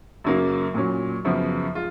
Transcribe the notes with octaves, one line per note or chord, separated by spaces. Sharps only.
F#2 C#3 F#3 A#3
A#2 F#3 C#4
F#2 C#3 F3 B3
G#3 F4